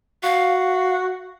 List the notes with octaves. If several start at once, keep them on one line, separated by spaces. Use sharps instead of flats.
F#4 F5